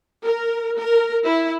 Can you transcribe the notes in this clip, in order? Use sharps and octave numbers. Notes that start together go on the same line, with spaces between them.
A#4
A#4
E4